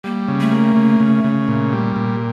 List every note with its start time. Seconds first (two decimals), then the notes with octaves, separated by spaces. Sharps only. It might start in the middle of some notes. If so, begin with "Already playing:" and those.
0.04 G3 A#3
0.28 C#3
0.40 A3
0.52 A#3
0.76 C#3
1.00 C#3
1.24 C#3
1.48 A#2
1.72 G3
1.96 A#2